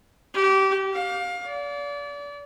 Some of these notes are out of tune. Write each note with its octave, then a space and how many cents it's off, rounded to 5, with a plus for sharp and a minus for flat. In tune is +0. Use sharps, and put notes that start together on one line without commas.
G4 -25
F5 +25
D5 -35